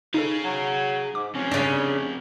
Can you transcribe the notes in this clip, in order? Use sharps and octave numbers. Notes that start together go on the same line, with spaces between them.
D#4 G#4 A4 F5
F#3
G#2 D6
C3 F3 C#4
C#3 D4